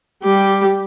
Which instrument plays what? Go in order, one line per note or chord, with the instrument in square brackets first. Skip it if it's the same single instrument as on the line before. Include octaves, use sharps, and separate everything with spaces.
[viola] G3 G4